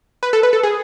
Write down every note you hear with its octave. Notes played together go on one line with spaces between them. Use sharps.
B4
A4
B4
A4
G#4